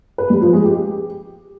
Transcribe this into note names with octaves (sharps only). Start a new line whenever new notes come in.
B4
G3
F3
G#3
G4